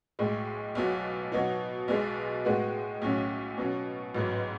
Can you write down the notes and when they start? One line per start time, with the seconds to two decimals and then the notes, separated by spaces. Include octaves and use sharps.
0.19 B1 A2 G#3
0.75 B1 B2 F#3
1.32 B2 F#3 B3 D#4
1.88 B1 B2 G#3
2.45 A2 G#3 B3 F#4
3.01 B1 A2 F#3 C#4
3.58 B2 F#3 C#4
4.15 A1 G#2 F#3 B3